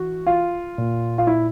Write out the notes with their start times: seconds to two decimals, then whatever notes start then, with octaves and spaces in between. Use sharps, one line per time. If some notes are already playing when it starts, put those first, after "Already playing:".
Already playing: E3 F#4
0.27 F4
0.78 A#2
1.18 F4
1.27 E4